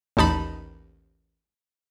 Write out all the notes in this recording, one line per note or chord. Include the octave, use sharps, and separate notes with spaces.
A1 D#2 D#4 A5 B5